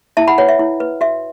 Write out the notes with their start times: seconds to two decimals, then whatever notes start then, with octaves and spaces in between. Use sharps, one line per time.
0.17 E4 E5 A5
0.28 F#5 B5
0.38 B4 C#5 F#5
0.49 E5
0.59 E4
0.80 B4
1.01 F#4 E5